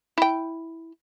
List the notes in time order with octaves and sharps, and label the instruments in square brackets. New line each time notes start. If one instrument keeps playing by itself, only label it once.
[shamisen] E4 G5